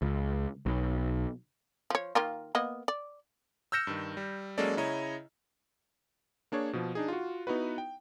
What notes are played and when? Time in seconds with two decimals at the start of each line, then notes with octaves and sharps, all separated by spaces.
0.02 C#2
0.66 B1
1.90 F3 C#5
2.15 D#3 A#3 F4
2.55 A#3 B3 D#5
2.88 D5
3.72 E6 F6 G6 A#6 C#7 E7
3.87 G2 D#3
4.17 G3
4.58 F#3 G#3 A#3 C#4 A4 D5
4.77 C#3 E4 C#5 D#5 A#5
6.52 A#3 D4 G#4 C#5
6.73 B2 F3
6.95 D4 D#4 G#4
7.08 F4 F#4
7.47 B3 D#4 E4 F#4 B4
7.78 G5